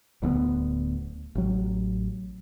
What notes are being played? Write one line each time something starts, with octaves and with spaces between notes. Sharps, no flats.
D1 D2 A#3 B3
A1 F#3